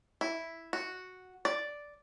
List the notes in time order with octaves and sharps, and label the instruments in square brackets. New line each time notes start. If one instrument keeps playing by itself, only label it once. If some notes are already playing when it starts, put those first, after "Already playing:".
[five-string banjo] E4
F#4
D5